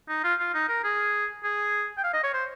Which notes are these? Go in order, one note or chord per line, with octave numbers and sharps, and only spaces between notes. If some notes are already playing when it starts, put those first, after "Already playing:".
D#4
F4
F4
D#4
A#4
G#4
G#4
G5
F5
D#5
C#5
C5